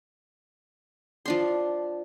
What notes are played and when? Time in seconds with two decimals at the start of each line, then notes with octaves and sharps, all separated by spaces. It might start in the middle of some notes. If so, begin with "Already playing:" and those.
1.26 F3 D4 C6